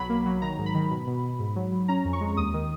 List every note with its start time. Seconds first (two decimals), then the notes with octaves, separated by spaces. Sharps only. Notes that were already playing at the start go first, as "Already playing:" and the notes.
Already playing: B1 F#3 B5
0.09 A#3
0.26 F#3
0.42 D#3 A#5
0.58 G#2
0.66 B5
0.74 D#3
0.91 B2
1.07 B2
1.23 B2
1.39 G#2
1.56 F#3
1.72 F#3
1.88 C#4 A#5
2.05 F2
2.13 C#6
2.21 G#3
2.37 D#2 D#6
2.54 D#3